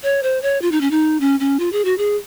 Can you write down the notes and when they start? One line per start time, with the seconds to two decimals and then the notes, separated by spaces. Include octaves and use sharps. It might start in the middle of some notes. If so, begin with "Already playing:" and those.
0.03 C#5
0.23 C5
0.42 C#5
0.62 F4
0.72 D#4
0.81 C#4
0.91 D#4
1.20 C#4
1.40 C#4
1.60 F4
1.72 G#4
1.85 F#4
1.98 G#4